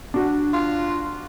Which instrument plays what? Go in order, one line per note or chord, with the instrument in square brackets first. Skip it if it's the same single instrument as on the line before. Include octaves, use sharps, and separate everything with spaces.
[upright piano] D4 F#4
[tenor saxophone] F4